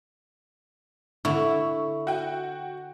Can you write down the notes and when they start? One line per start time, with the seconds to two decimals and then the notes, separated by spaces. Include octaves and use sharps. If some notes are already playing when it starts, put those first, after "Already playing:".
1.25 D3 E4 C#6
2.07 F#4 G5